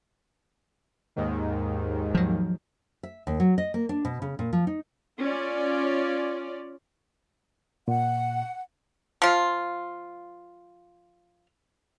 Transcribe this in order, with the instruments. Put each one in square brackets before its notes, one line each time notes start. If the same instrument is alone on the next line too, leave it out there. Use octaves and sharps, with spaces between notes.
[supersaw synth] D#2 G#2 D#3
[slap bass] F3 F#3
[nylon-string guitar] E5
D#2
F#3
D#5
A#3
D4
B2
C#3
A#2
F3
D#4
[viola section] C#4 F4 D5
[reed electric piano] A#2 [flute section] F#5
[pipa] F3 F4